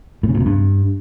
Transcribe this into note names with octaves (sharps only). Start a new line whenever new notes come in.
A2
C#3
A#2
C3
G2